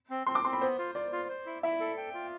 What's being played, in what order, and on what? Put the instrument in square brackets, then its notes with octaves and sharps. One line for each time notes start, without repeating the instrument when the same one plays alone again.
[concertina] C4
[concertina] C4 [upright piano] C6
[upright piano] D6
[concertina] C4 [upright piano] C6
[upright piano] B5
[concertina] B3 [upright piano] C5
[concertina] F4
[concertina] F4 [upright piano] D5
[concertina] F4
C5
E4
[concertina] E4 [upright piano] E5
[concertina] A4
G5
F4